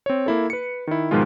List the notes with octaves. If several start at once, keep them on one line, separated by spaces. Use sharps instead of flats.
C4 C#5
A#3 E4 A4
B4 C#7
D#3 E4
G#2 B2 D#3 F3 G#3 F4